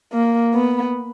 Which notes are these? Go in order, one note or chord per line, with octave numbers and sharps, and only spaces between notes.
A#3
B3